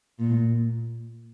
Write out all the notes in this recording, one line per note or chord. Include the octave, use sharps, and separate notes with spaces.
A#2